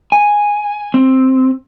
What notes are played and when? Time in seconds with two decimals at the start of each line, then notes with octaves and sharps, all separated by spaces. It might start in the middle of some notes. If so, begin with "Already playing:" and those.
0.12 G#5
0.94 C4